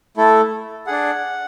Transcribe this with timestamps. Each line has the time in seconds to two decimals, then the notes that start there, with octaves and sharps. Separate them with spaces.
0.17 A3 E4 A4
0.87 D4 G#4 F#5